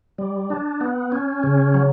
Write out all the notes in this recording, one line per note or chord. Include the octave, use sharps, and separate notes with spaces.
G3
D4
B3
C#4
C#3
F#3